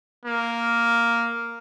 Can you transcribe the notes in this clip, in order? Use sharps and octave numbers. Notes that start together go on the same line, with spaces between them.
A#3